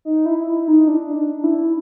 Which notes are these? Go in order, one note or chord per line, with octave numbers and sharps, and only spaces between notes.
D#4
E4
E4
D#4
D4
D4
E4